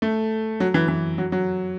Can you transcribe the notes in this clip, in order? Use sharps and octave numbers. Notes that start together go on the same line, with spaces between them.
A3
F#3
E3
E3
F#3
F#3